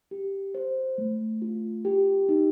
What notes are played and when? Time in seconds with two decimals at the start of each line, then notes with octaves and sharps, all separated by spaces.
0.11 G4
0.55 C5
0.98 A3
1.42 F4
1.85 G4
2.29 D#4